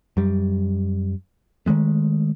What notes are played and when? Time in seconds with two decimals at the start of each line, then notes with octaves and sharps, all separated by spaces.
0.17 F#2 G3
1.66 D#3 F3 G#3 A3